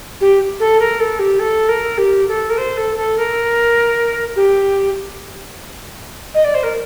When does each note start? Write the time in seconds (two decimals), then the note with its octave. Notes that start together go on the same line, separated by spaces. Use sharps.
0.20 G4
0.59 A4
0.79 A#4
0.99 A4
1.19 G4
1.39 A4
1.68 A#4
1.97 G4
2.27 A4
2.49 A#4
2.57 C5
2.77 A4
2.96 A4
3.16 A#4
4.35 G4
6.34 D#5
6.44 D5
6.54 C5
6.63 A#4